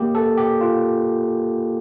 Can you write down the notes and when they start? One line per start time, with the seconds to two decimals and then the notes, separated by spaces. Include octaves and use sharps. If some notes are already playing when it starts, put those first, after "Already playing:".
Already playing: A#3 G4
0.15 A4
0.37 G4
0.61 F4